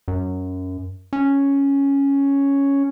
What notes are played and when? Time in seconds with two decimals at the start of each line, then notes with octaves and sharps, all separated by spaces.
0.08 F#2
1.13 C#4